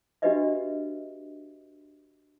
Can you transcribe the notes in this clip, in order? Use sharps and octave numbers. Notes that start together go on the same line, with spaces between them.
D4 F#4 G4 B4 D#5 E5